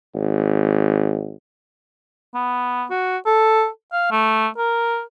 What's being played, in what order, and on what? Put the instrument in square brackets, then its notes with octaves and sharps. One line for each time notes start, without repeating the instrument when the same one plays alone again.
[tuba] G#1
[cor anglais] B3
F#4
A4
F5
A3
A#4